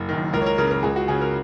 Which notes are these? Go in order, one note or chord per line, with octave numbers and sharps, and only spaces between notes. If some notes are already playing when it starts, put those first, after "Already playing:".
Already playing: F#1
F#2 D#3
C#2 A#4
C#5
A#4
C#3 A#4
A#4
C#2 G#4
F#4
C#3 G#4
A#4